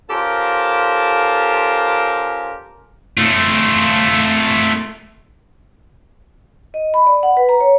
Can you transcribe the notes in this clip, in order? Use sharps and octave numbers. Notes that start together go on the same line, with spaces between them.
C#4 F4 G4 A4 A#4 C5
A3 F4
D#5
B5
D5
F#5
B4
A#5
C#5